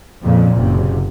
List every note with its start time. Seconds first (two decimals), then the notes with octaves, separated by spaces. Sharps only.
0.23 F2 A#2 C#3
0.55 F#1 C3